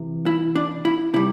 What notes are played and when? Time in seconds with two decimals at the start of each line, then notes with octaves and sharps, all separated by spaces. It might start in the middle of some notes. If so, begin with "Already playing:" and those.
Already playing: C3 E3
0.26 E4
0.56 D4
0.85 E4
1.14 C3 G3 E4